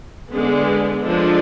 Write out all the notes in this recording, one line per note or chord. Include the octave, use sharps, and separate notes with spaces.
D3 G#3 B3
D3 F3 G#3 D4